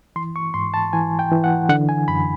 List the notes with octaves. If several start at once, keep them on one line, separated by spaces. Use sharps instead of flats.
E3 C6
C#6
G#2 C6
A5
E3 G#5
G5
E3
F#5
D3 F#5
G#5
F#2 B5